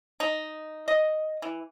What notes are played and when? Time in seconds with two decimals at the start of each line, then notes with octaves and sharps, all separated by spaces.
0.20 D#4
0.88 D#5
1.42 E3